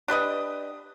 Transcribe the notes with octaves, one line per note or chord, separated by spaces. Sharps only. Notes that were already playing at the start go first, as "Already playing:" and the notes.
D4 G4 B4 D#5